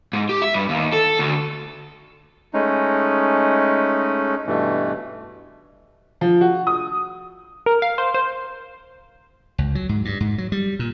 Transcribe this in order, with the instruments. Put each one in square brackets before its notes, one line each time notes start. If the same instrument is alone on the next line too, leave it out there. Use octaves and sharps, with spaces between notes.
[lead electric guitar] G#2
G4
E5
G2
D#2
A4
D2
[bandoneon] G#3 A3 C#4 D#4
G2 B2 E3 A3
[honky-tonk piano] F3
F#4
D#6
[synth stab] A#4
F5
C5
C5
[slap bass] C#2
F#3
G#2
G2
G#2
F#3
G3
A#2